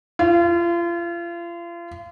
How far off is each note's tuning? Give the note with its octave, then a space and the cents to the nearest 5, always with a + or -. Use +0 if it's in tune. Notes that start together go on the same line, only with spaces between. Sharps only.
F4 -35